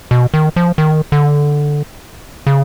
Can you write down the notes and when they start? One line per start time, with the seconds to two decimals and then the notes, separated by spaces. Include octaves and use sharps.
0.11 B2
0.34 D#3
0.56 F3
0.78 D#3
1.12 D3
2.47 C#3